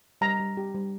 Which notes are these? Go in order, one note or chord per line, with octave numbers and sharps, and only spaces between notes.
G3 A#5
G3
G4
G3